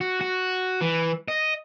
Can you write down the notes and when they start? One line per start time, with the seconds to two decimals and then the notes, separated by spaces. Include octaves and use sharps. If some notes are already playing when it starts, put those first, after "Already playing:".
0.01 F#4
0.21 F#4
0.81 E3
1.28 D#5